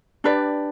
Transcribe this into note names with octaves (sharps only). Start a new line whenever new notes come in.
D4 G4 B4 D5